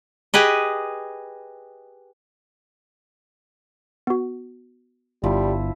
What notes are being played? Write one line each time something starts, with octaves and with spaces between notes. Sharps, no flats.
G4 G#4 B4 D#5
B3 F#4
G1 F3 G3 E4